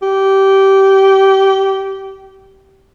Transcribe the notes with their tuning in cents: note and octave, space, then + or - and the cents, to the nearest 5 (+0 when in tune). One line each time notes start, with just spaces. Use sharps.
G4 -20